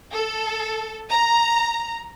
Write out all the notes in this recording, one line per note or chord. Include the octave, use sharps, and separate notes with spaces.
A4
A#5